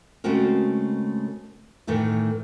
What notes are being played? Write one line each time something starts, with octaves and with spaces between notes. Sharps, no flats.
C#3 G#3 A3 C4 F#4 A#4
A2 D#3 E3 A3 B3